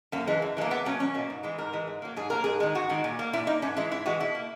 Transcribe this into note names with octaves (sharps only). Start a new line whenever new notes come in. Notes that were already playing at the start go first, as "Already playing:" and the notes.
F#2 A#3
E3 G#3
F#2
E3 G#3 A#3
E2 B3
B2 F#3 A#3 C#4
E2 C#4
B2 F#3 A#3
G#2
E3 G#3
G#2 A#4
E3 G#3
G#2
F#3 A#3
G#2 G#4
F#3 A#3 A#4
G#2 G#4
D#3 G#3
G#2 F#4
D#3 G#3
A#2
A#3
A#2 E4
A#3 D#4
G#2 C#4
E3 G#3 E4
G#2 E4
E3 G#3 F#4
B2 E4
A#3